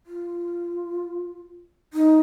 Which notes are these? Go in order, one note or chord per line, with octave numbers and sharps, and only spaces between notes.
F4
D#4